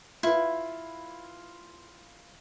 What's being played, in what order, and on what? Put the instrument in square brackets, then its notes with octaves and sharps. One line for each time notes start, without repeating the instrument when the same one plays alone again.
[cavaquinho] E4 [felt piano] F4 B4